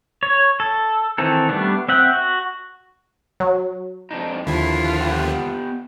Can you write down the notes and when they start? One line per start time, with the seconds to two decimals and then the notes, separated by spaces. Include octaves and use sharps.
0.23 C#5
0.60 A4
1.18 D#3 E3 C4 A4
1.49 G3 A3 B3 D4
1.88 C4 E5 F#5 G5
2.13 F#4
3.40 F#3
4.11 F2 D4 D#4
4.47 D#2 D3 F3 E4 F4
5.01 B3 G4 F#5